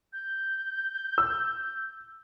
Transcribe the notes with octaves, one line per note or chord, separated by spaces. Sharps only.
G6
E6